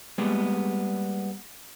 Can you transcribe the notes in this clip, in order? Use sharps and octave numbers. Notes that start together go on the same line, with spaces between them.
G3 G#3 A#3 B3 G#4